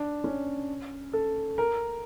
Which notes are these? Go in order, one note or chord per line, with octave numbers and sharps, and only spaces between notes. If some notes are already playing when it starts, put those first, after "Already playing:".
Already playing: D4
C#4
A4
A#4